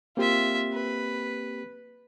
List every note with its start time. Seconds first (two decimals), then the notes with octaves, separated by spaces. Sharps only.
0.17 A#3 C4 F4 G4 E5
0.73 B4